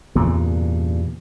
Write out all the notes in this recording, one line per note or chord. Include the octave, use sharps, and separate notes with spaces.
E2 G2 A#2 C#3